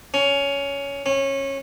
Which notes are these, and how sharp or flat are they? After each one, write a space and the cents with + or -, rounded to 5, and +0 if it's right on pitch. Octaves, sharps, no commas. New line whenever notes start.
C#4 +15
C#4 -20